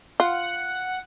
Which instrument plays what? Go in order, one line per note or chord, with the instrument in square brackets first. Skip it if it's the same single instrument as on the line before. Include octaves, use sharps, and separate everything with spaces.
[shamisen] F4 [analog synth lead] F#5